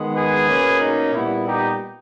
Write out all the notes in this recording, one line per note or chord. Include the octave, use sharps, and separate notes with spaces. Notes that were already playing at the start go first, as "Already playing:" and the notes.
Already playing: D#3 G#3 B3
G#4 B4
B2 A#3 C#4
D#4
A#2 G3 B3 E4
D#4 G4